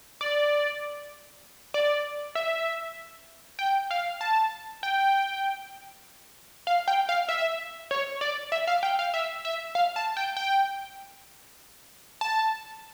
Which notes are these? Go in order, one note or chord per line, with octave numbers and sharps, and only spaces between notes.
D5
D5
E5
G5
F5
A5
G5
F5
G5
F5
E5
C#5
D5
E5
F5
G5
F5
E5
E5
F5
A5
G5
G5
A5